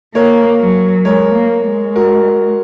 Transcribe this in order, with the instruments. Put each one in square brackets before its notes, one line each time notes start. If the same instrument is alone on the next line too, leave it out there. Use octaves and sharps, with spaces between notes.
[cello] A#3 [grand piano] A#4 C#5
[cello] F#3
[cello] G#3 [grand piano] A#4 C#5
[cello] A#3
G#3
[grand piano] F#4 A#4